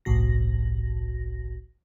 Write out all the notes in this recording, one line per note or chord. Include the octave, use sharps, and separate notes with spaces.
G1 C2 A2 F#4 A#6